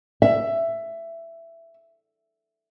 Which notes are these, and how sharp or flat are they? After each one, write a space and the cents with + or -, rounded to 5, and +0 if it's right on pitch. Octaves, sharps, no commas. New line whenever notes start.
E5 +15